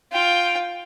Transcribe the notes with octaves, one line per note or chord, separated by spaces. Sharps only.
F4 G5